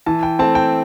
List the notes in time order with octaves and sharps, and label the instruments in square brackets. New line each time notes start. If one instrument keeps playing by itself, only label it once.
[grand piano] E3 A5
G5
A3 C4 A5
G5